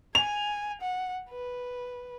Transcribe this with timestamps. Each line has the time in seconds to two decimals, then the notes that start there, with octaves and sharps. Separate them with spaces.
0.15 G#5 F7
0.81 F#5
1.30 B4